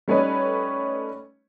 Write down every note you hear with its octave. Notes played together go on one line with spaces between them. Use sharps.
G3 A3 C#4 D#4 B4 C#5